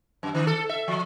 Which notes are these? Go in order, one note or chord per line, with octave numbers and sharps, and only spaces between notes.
F#2
D#3
A4
E5
F3